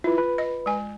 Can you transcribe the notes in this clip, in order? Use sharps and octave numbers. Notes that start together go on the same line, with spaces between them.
E4 F4 B4
B4
D#5
G#3 G#5